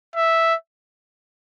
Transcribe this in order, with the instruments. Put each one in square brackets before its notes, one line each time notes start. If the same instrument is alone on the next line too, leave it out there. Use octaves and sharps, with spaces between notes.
[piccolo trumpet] E5